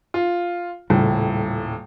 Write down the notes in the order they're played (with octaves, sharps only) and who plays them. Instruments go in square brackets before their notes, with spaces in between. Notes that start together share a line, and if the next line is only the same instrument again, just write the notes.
[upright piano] F4
[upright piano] D#1 A2 [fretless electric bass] C#3 G3